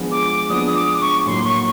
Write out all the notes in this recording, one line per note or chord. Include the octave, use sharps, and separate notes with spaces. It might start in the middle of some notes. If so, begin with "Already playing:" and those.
Already playing: F3 G#3 B3 D4
D6
F3 G#3 B3 D4 D#6
D6
C#6
A2 F#3 A#3 C6
C#6